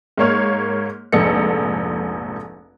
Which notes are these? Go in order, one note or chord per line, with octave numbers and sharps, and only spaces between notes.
G#2 A#3 C#5 F6
F1 A#1 G#2 A4 C#7